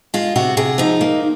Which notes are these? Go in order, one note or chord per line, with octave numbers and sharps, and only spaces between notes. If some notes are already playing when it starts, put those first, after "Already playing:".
G#3 F4
C3 F#4
C3 G#4
F3 D#4
A#3